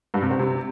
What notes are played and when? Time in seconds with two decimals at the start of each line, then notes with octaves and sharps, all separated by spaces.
0.14 G2
0.22 C3
0.31 C4
0.39 C3